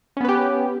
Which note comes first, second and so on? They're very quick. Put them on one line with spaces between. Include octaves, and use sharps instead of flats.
C#4 B3 B4 G4